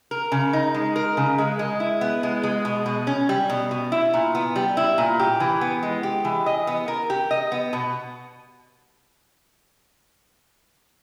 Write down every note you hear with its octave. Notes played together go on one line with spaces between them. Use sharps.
A#4
C#3
D#4
G#3
A#4
C#3
G#3
G#3
E4
B3
G#3
G#3
B2
B2
C#4
G3
B2
B2
E4
A#2
B3
G3
E4
A#2
G4
E3
B3
G#3
G4
E3
D#5
B3
A#4
G4
D#5
B3
B2